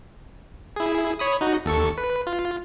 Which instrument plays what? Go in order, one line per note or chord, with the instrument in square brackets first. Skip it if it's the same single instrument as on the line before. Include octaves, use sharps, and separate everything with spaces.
[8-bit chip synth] E4 G#4
C#5 B5 D#6
D#4 F#4
D#2 A4 C#6
B4
F4